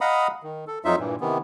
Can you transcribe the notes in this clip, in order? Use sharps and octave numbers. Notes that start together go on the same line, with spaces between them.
D#5 F5 F#5 A#5 B5 D#6
D#3
A4
F2 F#3 D#4 F4 E5
G2 A#2 E3
C3 D#3 E3 B3